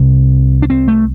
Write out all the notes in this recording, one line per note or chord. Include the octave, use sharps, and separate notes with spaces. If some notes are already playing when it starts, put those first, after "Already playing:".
Already playing: C2 C3 C4
D4
C4
A3